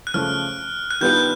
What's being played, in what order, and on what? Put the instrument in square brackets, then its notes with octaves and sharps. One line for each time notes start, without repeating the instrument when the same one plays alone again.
[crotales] F#6
[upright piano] C#3 F3 A3 [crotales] F6
[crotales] F#6
[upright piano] D#3 G3 B3 D4 F4 [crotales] G6